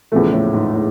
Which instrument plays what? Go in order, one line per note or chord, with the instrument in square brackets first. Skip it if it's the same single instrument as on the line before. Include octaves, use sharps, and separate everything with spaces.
[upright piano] E2 C#3 F3 A3 [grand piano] A#2
[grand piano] A2
G#2
A2